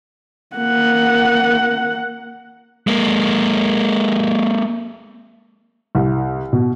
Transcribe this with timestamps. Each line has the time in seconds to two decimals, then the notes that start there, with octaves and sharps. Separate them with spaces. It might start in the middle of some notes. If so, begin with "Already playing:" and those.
0.56 A#3 F#5
2.87 G#3 A#3
5.95 C2
6.53 B2